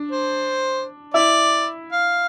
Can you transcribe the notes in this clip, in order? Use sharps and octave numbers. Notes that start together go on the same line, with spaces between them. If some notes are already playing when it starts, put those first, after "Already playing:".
Already playing: D4
C5
E4 D5
F5